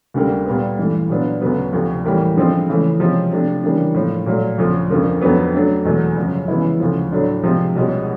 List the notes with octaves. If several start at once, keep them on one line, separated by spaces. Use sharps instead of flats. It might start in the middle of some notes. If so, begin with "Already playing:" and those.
D2 D3 G3 A#3
A#2 G3 B3
G2 E3 A3
A#2 F#3 B3 D4
D2 C#3 F#3 B3
D2 C3 F3
A2 E3 G3 A#3
D3 F3 G#3 C4
C#3 E3 A3
C3 F3 G#3 C#4
C3 F3 A3 D4
C#3 E3 G3 A#3 D4
A2 F3 A#3
A#2 F#3 A3
D2 C#3 F3
F2 D3 F3 A#3
F2 D3 F#3 B3
D3 F#3 A3 D4
E2 B2 F#3 A3
F#2 C#3 F3
C#3 E3 G#3 B3 E4
D2 C#3 F3
A2 F#3 A3 D4
C3 F3 G#3
C2 B2 G#3 C#4